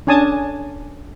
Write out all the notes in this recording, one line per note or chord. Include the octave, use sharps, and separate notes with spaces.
C#4 D4 G#5 A5 D#6